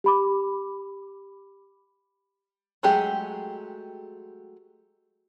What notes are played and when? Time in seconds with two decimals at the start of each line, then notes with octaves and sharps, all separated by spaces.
0.04 G4 B5 D6
2.83 F#3 G#3 A3 G4 G#4